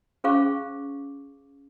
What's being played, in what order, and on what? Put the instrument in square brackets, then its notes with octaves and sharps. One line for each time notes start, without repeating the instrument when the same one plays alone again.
[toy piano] C#4 G#4 C5 F5 C#6 D6